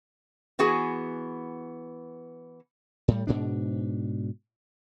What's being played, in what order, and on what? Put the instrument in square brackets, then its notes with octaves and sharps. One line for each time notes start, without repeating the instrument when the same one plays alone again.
[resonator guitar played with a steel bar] E3 B3 F#4 G#4 G#5
[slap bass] A2 G3
G#2 B2 D4